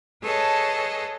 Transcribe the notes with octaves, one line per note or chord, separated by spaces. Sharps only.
G#4 A4 B4 C#5 D#5 A5